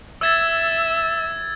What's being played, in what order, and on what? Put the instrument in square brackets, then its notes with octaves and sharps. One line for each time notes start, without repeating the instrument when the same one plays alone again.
[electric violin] E5 [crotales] E6 G#6 A6